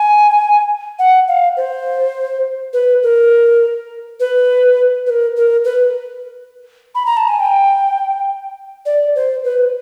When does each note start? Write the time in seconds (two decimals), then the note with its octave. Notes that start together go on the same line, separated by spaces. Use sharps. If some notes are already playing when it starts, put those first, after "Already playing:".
Already playing: G#5
0.99 F#5
1.28 F5
1.57 C5
2.73 B4
3.03 A#4
4.20 B4
5.06 B4
5.10 A#4
5.37 A#4
5.65 B4
6.95 B5
7.06 A#5
7.17 A5
7.28 G#5
7.40 G5
8.86 D5
9.15 C5
9.44 B4